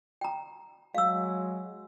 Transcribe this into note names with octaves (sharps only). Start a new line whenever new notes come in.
G5 A#5
F#3 G#3 F5 E6